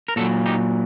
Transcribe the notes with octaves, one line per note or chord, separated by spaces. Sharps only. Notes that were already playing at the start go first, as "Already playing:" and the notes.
A#4
A#2 F#3 F#4 A4
D#4 G4